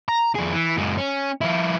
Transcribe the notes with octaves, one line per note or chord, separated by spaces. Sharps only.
A#5
F2 G#4
E3
F#2 G#3
C#4
F3 E4